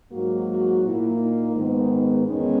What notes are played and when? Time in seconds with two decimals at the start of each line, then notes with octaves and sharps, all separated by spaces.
0.12 G#2 F#3 A#3 F#4
0.48 F#4
0.83 A#2 A#3 E4
1.19 D#4
1.55 G#2 D#3 G#3 B3
2.26 E2 D#3 G#3 B3 C#4